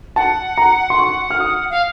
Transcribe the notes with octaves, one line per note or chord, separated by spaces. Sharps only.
F#5 A5
A#5
C6
C#6
F6
D#6
F5